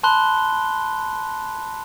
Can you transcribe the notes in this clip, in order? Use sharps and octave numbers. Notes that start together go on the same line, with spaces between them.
A5 B5 C6 F#6 G7